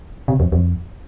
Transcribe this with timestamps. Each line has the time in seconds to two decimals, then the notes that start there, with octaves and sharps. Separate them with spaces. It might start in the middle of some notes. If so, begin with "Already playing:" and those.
0.28 C3
0.40 F2
0.52 F2